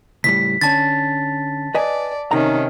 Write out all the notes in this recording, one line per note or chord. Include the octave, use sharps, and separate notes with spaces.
C#2 A2 G3 B6
D3 C#4 A5 A6
B4 D5 D#5 G#5
C3 D#3 C#4 D#4 A#5